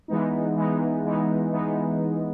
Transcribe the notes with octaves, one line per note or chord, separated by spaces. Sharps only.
E3 G#3 B3 D#4
E3 G#3 B3 D#4
E3 G#3 B3 D#4
E3 G#3 B3 D#4